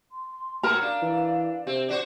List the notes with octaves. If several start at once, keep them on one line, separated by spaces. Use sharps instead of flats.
C6
A2 F#4 A#4 A#5
D4 F5
E3
C3 C4
D4 F#4 C5